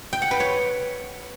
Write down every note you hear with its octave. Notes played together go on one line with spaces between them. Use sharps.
G5
F#5
B4
C#5